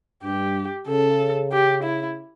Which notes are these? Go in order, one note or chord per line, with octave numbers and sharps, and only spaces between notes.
G2 G4
C#3 A4
G4
E4